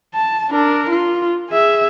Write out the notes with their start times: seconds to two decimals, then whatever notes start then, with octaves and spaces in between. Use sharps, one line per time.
0.14 A5
0.50 D4 A#4
0.89 F4
1.50 G#4 E5